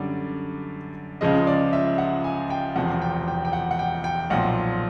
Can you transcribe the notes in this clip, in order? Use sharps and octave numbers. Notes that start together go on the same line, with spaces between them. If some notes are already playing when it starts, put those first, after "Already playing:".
Already playing: F#2 D3 G3 D5
C#2 C#3 F3 G#3 D#5
D5
E5
F#5
G#5
G5
E1 E2 C3 F3 F#5
G5
G5
G5
F#5
F#5
G5
G5
B1 A#2 F3 F#5